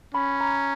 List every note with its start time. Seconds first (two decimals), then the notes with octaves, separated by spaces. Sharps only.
0.14 C#4 B5
0.41 A#5